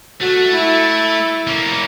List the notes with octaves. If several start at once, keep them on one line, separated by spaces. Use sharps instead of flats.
A3 F#4
E4
A#3 C#4